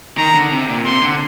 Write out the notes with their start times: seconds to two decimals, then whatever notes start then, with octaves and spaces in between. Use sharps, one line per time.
0.18 D#3 A#5
0.35 D3
0.51 C3
0.68 A#2
0.85 C3 C6
1.02 D3